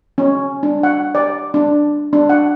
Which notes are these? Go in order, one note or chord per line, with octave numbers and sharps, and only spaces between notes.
C#4
D4
F#5
D5
D4
D4
F#5